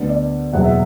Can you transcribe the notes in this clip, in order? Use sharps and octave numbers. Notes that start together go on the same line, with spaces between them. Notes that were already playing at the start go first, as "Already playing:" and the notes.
Already playing: D2 D3 B3
D5
F#1 E2 B2 F#3 F#5
E5